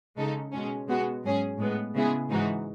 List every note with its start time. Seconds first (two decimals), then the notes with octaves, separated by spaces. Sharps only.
0.17 C#3 G#3 D#4 A4
0.53 B2 G#3 C#4
0.88 B2 G#3 B3 F#4
1.23 G#2 F#3 C#4 G#4
1.58 A2 G#3 B3
1.94 C#3 G#3 B3 E4 G#4
2.30 G#2 E3 G#3 D#4 F#4